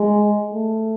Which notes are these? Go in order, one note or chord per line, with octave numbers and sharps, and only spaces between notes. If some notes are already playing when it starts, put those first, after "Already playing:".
Already playing: G#3
A3